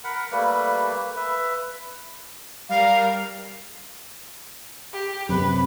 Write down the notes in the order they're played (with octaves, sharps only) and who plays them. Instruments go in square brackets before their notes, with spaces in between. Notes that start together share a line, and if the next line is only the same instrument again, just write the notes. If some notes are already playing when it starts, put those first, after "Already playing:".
[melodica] A#4 F#5 B5
G3 A3 A#3 B4
B4 E5
[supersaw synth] G3 A#4 [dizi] F5
[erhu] G4
[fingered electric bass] F#2 C3 [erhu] B4